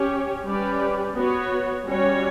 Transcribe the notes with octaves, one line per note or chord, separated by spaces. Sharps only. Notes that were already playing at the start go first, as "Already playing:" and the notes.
Already playing: C#4 G4 C#5
G3 C#4 G4 B4 D5
B3 F#4 C#5
G3 C#4 F#4 C#5